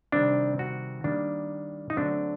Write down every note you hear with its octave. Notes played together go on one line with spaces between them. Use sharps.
C3 D#3 G3 C4 D4
F#4
D#3 G3 A#3 D4
D#4
D3 F#3 A3 C4 D4